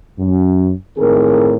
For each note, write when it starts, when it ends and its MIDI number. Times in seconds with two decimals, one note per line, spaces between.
0.19 0.71 42
0.98 1.56 45
0.98 1.56 51
0.98 1.56 60
0.98 1.56 68
0.98 1.56 70